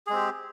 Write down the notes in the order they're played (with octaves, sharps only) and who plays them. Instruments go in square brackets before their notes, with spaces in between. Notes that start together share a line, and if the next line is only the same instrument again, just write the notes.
[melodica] G#4
G#3
C4
G4